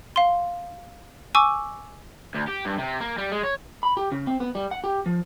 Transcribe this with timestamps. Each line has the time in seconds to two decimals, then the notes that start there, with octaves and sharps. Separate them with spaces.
0.16 F5 C6
1.35 G#5 C#6 D6 E6
2.35 D2
2.49 G4
2.66 G2
2.78 C3
3.01 A#3
3.18 G3
3.32 G#3
3.44 C#5
3.83 B5
3.97 G4
4.12 C#3
4.27 C4
4.40 B3
4.55 G3
4.71 F#5
4.84 G4
5.06 F3